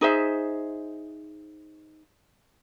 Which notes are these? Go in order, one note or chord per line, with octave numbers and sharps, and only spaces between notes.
D#4 G#4 C5 E5